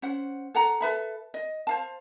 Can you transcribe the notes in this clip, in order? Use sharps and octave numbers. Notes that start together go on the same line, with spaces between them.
C#4 C5 F#5
A4 F#5 A#5
A4 B4 E5 B5
D#5
C5 F5 A5